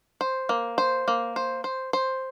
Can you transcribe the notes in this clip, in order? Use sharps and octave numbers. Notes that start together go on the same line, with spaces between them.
C5
A#3
C5
A#3
C5
C5
C5